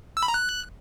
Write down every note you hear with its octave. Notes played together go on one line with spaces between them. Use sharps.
E6
B5
A#5
F#6